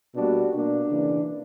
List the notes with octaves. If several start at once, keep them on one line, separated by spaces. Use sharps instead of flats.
B2 G3 A#3 D4 F#4
B2 A#3 D4
C#3 E3 A#3